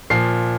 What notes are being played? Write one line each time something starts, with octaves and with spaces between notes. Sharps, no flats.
A#2 F3 C7